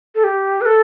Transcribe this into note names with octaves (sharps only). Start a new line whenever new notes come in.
A4
G4
B4
A4